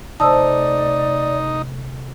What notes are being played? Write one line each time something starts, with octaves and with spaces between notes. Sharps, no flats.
C3 A3 D#4 D5 A5 D#6 E6